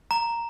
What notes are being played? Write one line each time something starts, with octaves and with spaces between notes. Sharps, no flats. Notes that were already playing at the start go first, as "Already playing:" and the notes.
A#5